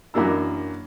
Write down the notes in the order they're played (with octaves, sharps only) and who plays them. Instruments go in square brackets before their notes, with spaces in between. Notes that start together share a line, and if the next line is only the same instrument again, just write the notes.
[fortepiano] F#2 E3 A#3 D4 E6